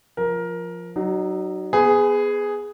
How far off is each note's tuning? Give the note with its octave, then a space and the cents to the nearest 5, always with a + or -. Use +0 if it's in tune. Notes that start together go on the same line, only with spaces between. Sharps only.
F3 +0 A#4 +15
F#3 +20 D#4 -25
B3 -10 G#4 +0 B4 +35